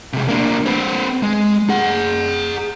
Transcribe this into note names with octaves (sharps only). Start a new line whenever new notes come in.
C3 G#3
A#3 D4
C4 B4
G#3
G#4 F#5